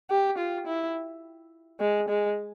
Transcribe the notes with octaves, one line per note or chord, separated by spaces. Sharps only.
G4
F4
E4
G#3
G#3